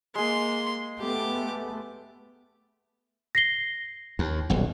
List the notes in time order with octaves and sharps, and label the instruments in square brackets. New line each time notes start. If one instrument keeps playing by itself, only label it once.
[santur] G#3 G#4 [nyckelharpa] A#3 C6
[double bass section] A3 B3 [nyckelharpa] G4 D6
[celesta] A#6 C7 G7
[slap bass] D#2
D#1 B1